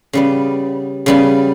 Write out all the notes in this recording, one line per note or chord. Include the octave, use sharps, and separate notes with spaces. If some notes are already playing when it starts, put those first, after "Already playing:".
C#3 G3 B3
C#3 G3 B3